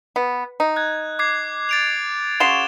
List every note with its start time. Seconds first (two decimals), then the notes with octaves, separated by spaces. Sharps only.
0.16 B3
0.60 D#4
0.76 F#6 G#6
1.19 D6 G#6 C7
1.69 A6 D7 F7
2.40 C#3 F#4 C6 E7 F7 G7